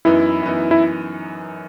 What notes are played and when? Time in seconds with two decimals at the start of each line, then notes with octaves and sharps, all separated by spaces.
0.05 F#2 E3 B3 D#4 E4
0.43 F#2 E3 B3 D#4
0.71 E4